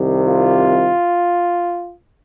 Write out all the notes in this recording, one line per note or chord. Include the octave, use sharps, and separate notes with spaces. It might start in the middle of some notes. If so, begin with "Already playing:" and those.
Already playing: C2 C3 D#3
F4